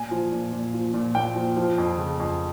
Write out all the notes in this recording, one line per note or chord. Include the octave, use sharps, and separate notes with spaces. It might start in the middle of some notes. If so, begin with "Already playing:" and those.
Already playing: A#2 G#5
F3
A#2
A#2
F3
A#2
A#2 G5
F3
F3
F2
C#3
F2